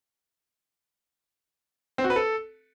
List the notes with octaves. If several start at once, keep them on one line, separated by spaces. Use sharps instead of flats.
C4
F#4
B4
A4